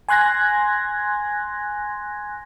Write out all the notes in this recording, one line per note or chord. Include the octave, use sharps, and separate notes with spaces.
G#5 C6 F#6 G#6 A#6